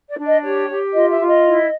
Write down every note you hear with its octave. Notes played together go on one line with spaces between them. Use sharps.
D5
D4
D#5
G4 C#5
G4
F4 D#5
E5
F4
D#5
E4